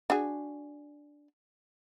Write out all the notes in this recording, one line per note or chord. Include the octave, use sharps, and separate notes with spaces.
D4 F#4 G#4